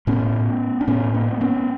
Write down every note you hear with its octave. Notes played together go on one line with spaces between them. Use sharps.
A2 B3 C#4
D4
A2 B3 C#4
A#3 C4
B3 C#4